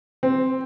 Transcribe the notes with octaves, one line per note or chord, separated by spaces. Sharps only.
C4